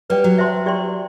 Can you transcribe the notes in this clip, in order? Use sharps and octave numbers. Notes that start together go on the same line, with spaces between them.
G3 B4 D5 G5
F#3
C5 E5 A5 C6
G4 D5 G5 C6